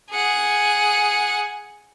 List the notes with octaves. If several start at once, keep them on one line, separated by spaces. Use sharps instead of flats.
G#4 F#5